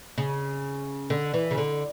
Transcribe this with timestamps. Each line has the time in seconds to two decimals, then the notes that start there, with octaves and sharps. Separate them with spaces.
0.18 C#3
1.10 D3
1.34 E3
1.51 C#3
1.58 D3